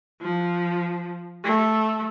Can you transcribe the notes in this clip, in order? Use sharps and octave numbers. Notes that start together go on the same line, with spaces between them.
F3
A3